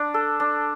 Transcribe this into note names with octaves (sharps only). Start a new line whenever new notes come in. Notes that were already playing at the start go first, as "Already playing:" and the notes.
Already playing: D4
A4
D4